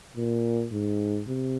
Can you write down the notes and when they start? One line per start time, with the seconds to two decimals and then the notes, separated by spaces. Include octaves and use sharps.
0.16 A#2
0.72 G#2
1.27 C3